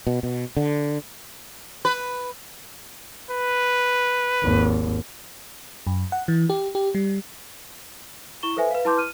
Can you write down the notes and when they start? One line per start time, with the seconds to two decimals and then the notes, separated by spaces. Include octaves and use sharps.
0.07 B2
0.23 B2
0.57 D3
1.85 B4
3.30 B4
4.43 G#1 D#2
5.87 F#2
6.12 F#5
6.28 E3
6.50 G4
6.75 G4
6.95 G3
8.43 E4 C#6 E7 G7
8.56 A4 B4 C5 E5 G#5
8.71 B4 F5
8.85 E4 B4 A5 C6 D6 G6
8.97 F6 D#7